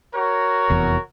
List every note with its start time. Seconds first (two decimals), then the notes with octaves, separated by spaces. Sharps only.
0.14 F#4 A#4 C#5
0.70 F1 E2